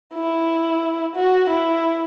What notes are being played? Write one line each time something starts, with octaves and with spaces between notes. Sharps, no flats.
E4
F#4
E4